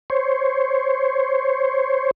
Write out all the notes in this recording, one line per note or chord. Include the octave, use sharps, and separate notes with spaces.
C5 C#5